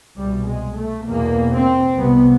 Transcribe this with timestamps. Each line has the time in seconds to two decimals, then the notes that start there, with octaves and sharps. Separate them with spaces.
0.17 C2 B2 G3
0.47 G#3
0.77 A3
1.07 E2 B2 A#3
1.52 C4
1.97 C2 C3 B3